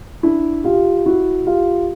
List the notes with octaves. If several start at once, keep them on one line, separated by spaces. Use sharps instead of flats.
D4 E4
F4 G4
E4 F#4
F4 G4